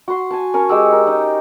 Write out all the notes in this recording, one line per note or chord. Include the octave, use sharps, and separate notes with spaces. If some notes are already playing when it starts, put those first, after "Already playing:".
F#4 C6
G#5 A5
C#4 A#4 C#5
G#3 G4 E6
A#4
D#4